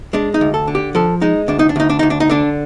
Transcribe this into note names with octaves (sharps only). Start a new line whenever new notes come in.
G#3 D4
D#4
D2
A4
D3
G4
F3 A4
G#3 D#4
D2 D4
D#4
D4
D2 D#4
D4
D2 D#4
D4
D#4
D3 D4